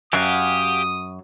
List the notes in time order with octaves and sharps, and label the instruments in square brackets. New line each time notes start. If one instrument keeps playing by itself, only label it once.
[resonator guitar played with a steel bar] F#2 [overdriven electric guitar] G4 [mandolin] F5 F#5 G#5 [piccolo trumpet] D#6